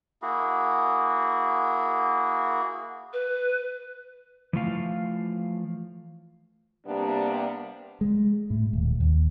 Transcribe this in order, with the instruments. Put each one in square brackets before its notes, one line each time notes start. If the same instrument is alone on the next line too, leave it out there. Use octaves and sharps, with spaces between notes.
[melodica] A#3 E4 F#4 G#4
[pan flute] B4
[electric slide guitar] E3 F3 A3 F5
[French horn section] C3 G3 A#3 B3 D4
[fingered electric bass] G#3
A2
D#1
D#2